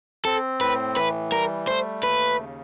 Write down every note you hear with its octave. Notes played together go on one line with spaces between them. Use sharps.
C4 A4
A2 B4
E3 B4
G3 A#4
A3 C5
D#2 B4
C#3